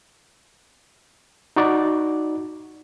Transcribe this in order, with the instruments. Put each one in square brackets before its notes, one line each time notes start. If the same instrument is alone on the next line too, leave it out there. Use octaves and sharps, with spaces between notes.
[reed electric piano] D#4 F#4 D5